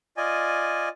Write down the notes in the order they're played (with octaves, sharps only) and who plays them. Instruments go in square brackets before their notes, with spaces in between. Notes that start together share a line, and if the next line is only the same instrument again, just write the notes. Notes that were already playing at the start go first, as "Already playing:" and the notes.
[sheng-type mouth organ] F4 D5 D#5 G#5